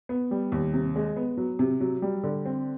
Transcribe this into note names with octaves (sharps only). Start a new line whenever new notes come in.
B3
G3
D#2
C3
G#3
B3
F#3
C3
F#3
G3
D3
C4